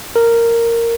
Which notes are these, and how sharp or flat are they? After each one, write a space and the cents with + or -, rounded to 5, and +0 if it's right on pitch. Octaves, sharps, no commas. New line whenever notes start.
A#4 -10